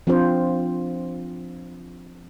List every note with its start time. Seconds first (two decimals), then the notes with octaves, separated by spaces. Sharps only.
0.07 F3 C4 D4 F4 C5